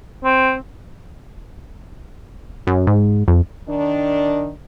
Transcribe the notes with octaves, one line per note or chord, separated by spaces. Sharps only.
C4
F#2
G#2
F2
D#3 D4